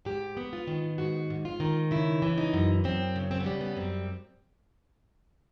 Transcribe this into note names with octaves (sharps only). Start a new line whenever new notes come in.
G#2 G4
B3
F4
D#3
G#2 F#4
G#2
F4
D#3
C#3 E4
E3
D#4
F#2
F#2 C4
C#3
C4
B3
G3
B3
F#2 C4